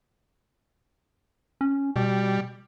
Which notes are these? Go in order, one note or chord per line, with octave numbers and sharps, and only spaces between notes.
C#4
B2 G3